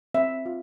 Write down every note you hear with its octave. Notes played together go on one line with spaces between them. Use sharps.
C4 E5
F4